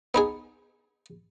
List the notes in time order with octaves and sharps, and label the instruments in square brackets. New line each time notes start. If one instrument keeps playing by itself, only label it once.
[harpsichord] B3 D#4 G#4